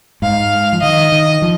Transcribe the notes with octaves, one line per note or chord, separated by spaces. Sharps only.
G#2 F5
F3
D#3 D#5
D#3
F3